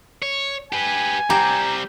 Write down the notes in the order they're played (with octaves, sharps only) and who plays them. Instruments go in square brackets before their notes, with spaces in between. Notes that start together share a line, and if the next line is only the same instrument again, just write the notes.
[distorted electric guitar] C#5
[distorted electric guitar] G4 B4 [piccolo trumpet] G#5
[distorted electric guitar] G3 C4 [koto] G4 [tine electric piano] A#5